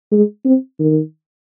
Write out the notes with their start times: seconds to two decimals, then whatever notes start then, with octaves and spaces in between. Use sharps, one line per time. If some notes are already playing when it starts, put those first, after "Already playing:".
0.12 G#3
0.45 C4
0.79 D#3